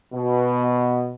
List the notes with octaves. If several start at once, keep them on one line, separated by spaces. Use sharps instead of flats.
B2